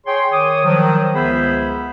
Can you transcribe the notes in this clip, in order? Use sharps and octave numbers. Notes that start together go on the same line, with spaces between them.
G#4 C#5 G5 C6
D#3 C#5 D6 D#6
D#3 F3 F#3
C#2 B3 G#4 C5 E5 B5